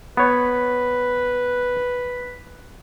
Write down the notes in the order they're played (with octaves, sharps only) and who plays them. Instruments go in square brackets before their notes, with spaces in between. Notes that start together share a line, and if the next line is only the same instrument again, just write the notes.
[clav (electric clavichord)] B3 C#5 [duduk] B4